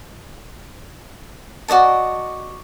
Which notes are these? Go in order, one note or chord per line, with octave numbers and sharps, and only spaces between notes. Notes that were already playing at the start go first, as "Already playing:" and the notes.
F#4 D5 D#5 A5